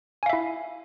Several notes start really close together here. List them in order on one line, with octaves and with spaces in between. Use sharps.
G#5 F5 E5 E4